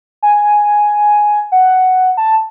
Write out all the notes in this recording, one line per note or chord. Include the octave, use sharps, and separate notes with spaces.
G#5
F#5
A5